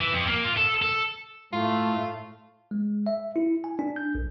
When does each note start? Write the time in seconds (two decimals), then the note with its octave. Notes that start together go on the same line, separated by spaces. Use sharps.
0.01 E3
0.13 F2
0.27 A#3
0.44 F4
0.57 A4
0.82 A4
1.53 A2 A3 F4
2.71 G#3
3.06 E5
3.36 E4
3.64 G#5
3.79 D4
3.96 G6
4.15 B1